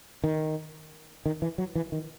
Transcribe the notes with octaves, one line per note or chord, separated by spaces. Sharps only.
D#3
D#3
E3
F#3
E3
D#3